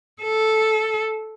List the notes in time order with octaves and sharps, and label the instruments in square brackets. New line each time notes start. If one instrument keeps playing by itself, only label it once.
[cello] A4